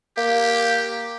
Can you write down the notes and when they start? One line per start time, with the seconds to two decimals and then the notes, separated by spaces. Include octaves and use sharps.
0.18 A#3 G4